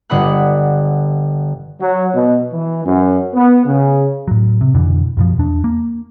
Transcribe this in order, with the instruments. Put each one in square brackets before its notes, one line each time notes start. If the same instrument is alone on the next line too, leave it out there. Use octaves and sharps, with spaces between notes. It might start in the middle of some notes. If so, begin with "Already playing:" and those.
[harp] G1 D3 D#5 F#5 B5 F#6
[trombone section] F#3
B2
E3
F#2
B3
C#3
[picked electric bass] A2 F#3
C3
F2 B2 D3 E3
F#2 B2 F3
E2 D4
A#3